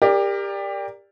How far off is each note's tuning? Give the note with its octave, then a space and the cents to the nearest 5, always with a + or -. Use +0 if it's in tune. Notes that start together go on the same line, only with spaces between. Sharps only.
G4 +25 A#4 +0 D5 +0